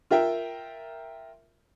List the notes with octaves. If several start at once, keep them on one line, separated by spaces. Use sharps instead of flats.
F4 A#4 E5 G5